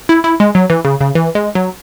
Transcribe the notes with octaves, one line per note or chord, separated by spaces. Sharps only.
E4
E4
G#3
F#3
E3
C#3
C#3
E3
G#3
F#3